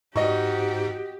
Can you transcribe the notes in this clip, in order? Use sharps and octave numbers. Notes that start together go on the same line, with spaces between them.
G#2 F#4 G4 D#5 C#6